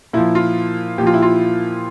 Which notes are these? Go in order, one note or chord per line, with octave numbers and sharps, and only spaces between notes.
A#2 F3 E4
F4
A#2 F3 F4 G4
E4
F4